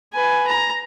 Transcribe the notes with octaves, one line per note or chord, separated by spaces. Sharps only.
B4 G#5
A#5